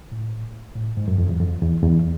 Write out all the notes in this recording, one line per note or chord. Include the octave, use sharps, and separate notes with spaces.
A2
A2
G#2
F#2
F2
E2
F2
E2
E2